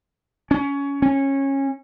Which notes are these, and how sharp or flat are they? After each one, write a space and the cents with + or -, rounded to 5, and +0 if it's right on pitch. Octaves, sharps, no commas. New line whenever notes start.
C#4 +20
C#4 -20